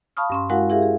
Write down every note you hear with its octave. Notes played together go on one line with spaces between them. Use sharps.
F5 A5 B5 C#6 D#6 F6
G2 C#4 C6
G#3 E4 F#4 A#4 F5 F#5
E4 G4 G#4 A#4 E5 F5
G#4